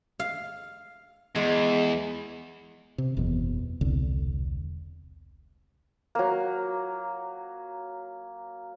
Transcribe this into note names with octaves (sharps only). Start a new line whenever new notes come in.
F5
E2 G#3
C3
F#1 E2 B2
E1 C2 D3
F#3 A#3